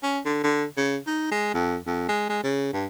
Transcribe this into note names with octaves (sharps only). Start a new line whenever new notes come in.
C#4
D3
D3
C#3
D#4
G#3
F2
F2
G#3
G#3
C#3
G2